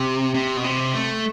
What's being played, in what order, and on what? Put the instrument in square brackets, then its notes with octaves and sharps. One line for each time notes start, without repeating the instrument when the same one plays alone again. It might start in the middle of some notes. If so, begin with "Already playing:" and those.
Already playing: [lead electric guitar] C3
C3
B2
C3
A3